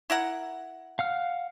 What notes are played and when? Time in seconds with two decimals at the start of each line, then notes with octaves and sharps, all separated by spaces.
0.10 E4 A#4 F#5
0.99 F5 F#5 F6